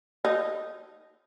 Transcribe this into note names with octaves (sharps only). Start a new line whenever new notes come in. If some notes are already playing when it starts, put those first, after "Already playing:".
D#4